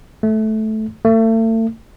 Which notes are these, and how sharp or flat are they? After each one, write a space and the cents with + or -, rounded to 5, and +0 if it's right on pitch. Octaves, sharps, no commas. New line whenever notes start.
A3 -15
A3 +35